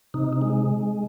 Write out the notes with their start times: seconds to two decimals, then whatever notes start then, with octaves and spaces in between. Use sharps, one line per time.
0.14 C3 D#4
0.33 D#4
0.41 G#3